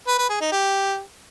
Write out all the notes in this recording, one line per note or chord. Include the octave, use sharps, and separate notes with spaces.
B4
B4
G#4
D#4
G4